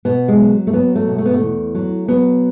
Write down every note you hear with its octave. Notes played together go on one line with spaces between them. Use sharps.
B2 B3
G#3
F#3
A3
F#3 B3
A3
B2
A3
B3
A3
E2
F#3
F#3 B3